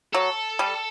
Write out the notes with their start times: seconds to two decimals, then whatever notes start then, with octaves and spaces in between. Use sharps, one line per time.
0.14 F#3 A4
0.59 G3